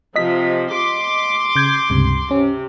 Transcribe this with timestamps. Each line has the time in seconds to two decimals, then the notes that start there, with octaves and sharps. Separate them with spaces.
0.16 C3 F3 D#5 B6
0.72 C6 D6
1.56 C#3 G6 G#6
1.90 C#2 G2 C3
2.31 C3 C#4